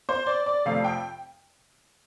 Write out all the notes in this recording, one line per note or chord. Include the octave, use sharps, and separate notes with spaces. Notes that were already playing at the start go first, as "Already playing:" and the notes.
C5
D5
D5
F2 C3 F3 A3 F5
G5